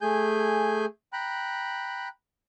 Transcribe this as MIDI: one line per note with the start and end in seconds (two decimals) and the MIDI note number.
0.01 0.85 57
0.01 0.85 68
0.01 0.85 80
0.01 0.85 91
1.13 2.08 79
1.13 2.08 82
1.13 2.08 83
1.13 2.08 90